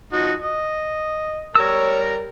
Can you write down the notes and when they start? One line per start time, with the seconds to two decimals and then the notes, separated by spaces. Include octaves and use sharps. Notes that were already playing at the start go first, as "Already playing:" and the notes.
0.13 F3 D#4 F#4
0.41 D#5
1.55 G3 A#4 C#5 A#5 E6